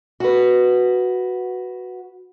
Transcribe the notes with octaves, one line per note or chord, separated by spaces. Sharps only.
F#4 B4